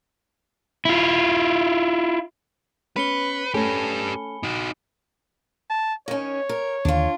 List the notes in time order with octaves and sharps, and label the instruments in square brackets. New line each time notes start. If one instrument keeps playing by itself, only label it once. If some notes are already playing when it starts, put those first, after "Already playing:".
[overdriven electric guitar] E4 F4
[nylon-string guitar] B3 C#4 [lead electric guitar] B4 [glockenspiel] B5 C#7 G7
[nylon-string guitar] A3 C#4 A4 [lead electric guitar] G4 B4 [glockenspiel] G#5
[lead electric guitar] D#4 F#4
[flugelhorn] A5
[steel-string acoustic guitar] D#3 C#4 [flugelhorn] C#5
[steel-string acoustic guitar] A#4
[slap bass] D#2 D3 [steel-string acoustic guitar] D4 F4